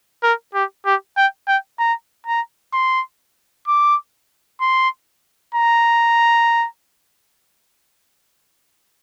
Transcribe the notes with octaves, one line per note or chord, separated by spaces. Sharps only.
A#4
G4
G4
G5
G5
A#5
A#5
C6
D6
C6
A#5